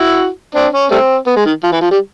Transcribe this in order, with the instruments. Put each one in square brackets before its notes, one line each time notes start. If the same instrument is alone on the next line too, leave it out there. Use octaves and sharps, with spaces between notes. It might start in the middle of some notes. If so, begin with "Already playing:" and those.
Already playing: [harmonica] E4 F#4
C4 D4
C#4
G3 A3 C4
B3
G#3
D#3
F3
E3
F3
G3